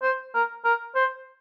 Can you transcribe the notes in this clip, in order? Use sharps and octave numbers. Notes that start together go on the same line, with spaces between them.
C5
A#4
A#4
C5